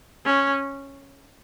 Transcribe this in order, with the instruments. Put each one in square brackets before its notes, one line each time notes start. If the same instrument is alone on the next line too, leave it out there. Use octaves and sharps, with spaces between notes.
[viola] C#4